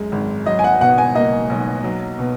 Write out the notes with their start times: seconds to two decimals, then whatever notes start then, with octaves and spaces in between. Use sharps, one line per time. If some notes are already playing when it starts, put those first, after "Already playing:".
Already playing: F#2 G#3
0.12 G#1
0.46 F#3 D#5
0.59 G#5
0.64 F#5
0.81 B2 F#5
0.98 G#5
1.15 A#3 D#5
1.50 B1
1.84 F#3
2.19 B2